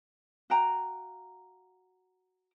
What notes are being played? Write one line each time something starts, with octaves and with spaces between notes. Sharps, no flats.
F#4 F5 G5 A#5